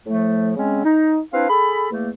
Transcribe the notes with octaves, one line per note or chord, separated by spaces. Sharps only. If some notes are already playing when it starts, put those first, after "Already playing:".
A2 F3 A3
C#3 G#3 C4 C#4
D#4
C4 D4 E4 B4 F5
G#4 A4 B5
E2 A3 A#3